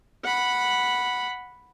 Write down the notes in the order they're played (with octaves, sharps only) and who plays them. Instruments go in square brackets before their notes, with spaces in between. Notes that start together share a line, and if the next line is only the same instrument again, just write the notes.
[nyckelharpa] F#5 B5